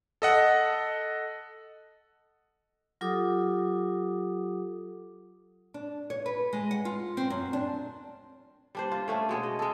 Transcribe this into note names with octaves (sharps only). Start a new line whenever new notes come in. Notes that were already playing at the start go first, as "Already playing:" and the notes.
A4 D#5 F#5
F#3 F4 G4 A4 D6 D#6
D4
C#5
B4
G#3
F#5
F4
C4
F#2
D4
G3 D4 C5
F4
A3 C#4 D4
B2 G#3 C#5
D#5
G#3 A4